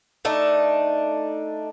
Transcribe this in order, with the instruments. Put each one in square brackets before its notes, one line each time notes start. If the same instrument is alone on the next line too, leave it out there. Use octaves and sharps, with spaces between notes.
[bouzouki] A3 D4 D#4